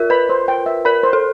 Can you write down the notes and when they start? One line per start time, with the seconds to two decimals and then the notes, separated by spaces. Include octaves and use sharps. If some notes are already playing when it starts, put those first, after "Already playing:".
Already playing: F4 A#4 E5
0.10 B4 B5
0.29 C5
0.48 G5
0.66 E5
0.85 A#4 B5
1.03 C5
1.13 A4